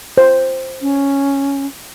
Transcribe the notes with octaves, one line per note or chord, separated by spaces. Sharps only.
C5
C#4